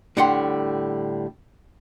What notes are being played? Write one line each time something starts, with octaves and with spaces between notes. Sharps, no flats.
A2 D3 G3 F#5 G5 C6